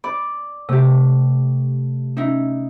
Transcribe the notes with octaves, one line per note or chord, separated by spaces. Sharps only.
D5 B5
C3 A3 G4
C#4 D#4 E4